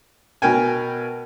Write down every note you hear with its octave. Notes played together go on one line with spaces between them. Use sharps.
B2 A#4 G5 G#5